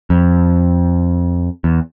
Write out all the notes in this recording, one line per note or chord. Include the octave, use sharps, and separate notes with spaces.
F2
E2